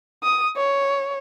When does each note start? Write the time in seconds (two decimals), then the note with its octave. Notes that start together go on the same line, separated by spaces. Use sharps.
0.23 D#6
0.57 C#5